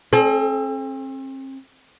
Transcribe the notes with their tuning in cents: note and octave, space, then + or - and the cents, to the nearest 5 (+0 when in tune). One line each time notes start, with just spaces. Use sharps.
C4 +40 A4 -40